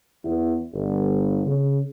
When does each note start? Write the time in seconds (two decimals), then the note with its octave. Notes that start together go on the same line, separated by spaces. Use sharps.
0.24 E2
0.73 G1
1.45 C#3